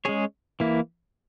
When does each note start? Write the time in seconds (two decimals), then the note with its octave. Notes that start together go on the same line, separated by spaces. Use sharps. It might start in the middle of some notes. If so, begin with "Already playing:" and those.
0.05 G#3 C#4 G#4 C#5
0.60 E3 A#3 E4